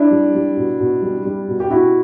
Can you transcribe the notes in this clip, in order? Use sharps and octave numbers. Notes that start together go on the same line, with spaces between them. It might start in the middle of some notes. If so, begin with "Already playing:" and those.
Already playing: D4 E4
G3
G3
B2
B2
G3
G3
B2
G4
B2 E4 F#4